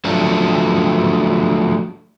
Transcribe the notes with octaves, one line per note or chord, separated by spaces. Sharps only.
F3 F#3 A3 D4